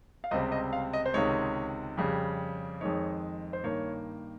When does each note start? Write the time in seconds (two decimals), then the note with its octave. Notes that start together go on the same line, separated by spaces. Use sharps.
0.24 F5
0.31 C#2 C3 G3 C4 D#5
0.52 D#5
0.73 F5
0.93 D#5
1.06 C5
1.14 C#2 C3 D#3 G#3 C#5
1.97 F2 C#3 G3
2.81 F2 D#3 G#3 D#4 C#5
3.53 C5
3.64 G2 D#3 A#3 C#5